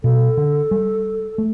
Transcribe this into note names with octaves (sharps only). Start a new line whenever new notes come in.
B2 A4
D3
G3
A3